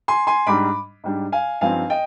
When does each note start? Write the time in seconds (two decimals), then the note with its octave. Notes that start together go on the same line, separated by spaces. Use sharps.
0.08 G#5 C6
0.27 G#5 C6
0.47 G#2 G3 D4 B5 D6
1.04 G#2 G3 D4
1.32 F5 G#5
1.61 G2 F3 C4 D#4 F5 G#5
1.90 D#5 G5